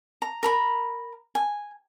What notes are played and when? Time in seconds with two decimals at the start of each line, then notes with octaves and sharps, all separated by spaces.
0.22 A#5
0.43 A#4 A#5 B5
1.35 G#5